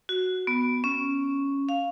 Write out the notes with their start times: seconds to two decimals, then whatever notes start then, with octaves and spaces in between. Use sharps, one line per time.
0.09 F#4
0.47 B3
0.84 C#4
1.69 F5